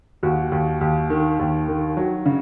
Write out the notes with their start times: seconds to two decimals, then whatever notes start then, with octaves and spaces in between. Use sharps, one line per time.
0.23 D#2 F#4
0.52 D#2
0.81 D#2
1.10 D#3
1.39 D#2
1.68 D#3
1.97 F#3
2.26 C#3